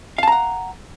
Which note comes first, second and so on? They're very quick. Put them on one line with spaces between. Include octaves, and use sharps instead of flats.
F5 A5 A#5 F#5